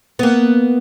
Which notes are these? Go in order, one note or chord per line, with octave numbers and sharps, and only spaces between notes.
A#3 B3